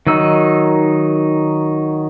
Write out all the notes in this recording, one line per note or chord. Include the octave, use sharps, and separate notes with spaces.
D#3 F#3 D#4 E6